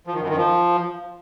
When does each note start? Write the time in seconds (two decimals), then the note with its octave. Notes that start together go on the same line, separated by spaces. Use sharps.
0.07 F3
0.14 D#3
0.22 F#2
0.29 D#3
0.37 F3